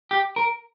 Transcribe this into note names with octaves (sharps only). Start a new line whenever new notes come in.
G4
A#4